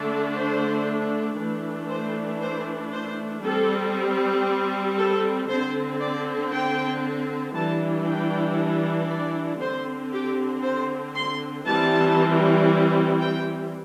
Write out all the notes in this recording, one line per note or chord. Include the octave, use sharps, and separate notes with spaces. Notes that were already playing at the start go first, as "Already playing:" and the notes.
Already playing: D3 A3 D4
C5
E3 A3 D4
C5
C5
C5
G3 C4 A4
A4
D3 C4 C5
D5
G5
E3 G3 D4 A5
G5
D5
D3 C4 C5
G4
C5
C6
E3 G3 C4 A5
G5